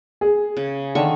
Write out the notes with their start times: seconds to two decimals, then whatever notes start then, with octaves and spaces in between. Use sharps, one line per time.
0.21 G#4
0.57 C#3
0.95 D3 D#3 C#6